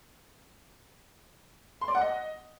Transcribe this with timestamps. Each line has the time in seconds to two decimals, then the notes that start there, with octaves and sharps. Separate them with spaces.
1.81 C6
1.88 D5
1.95 F#5
2.01 D#5